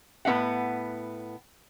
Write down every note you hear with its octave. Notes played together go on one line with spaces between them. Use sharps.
A2 B3 C#4 F5 F#5